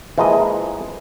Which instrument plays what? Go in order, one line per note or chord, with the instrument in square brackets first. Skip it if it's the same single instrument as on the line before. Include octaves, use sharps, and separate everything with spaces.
[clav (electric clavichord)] E3 F3 G#3 A#3 D#5